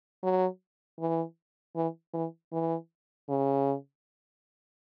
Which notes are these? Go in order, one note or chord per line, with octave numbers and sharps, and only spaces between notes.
F#3
E3
E3
E3
E3
C#3